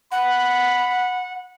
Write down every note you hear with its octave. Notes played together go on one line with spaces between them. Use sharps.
F#5 B5